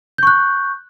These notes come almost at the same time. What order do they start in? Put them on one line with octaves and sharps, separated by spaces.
G6 C#6 F#6